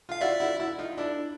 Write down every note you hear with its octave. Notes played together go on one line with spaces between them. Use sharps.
F4 F5
E4 F#4 D5 E5
E4 F#4
E4 F#4
D#4 F4
D4 E4